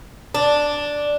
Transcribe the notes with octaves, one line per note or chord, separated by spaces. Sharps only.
D4